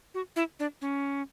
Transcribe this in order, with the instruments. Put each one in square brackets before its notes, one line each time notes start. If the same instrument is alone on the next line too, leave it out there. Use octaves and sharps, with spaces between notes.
[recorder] F#4
E4
D4
C#4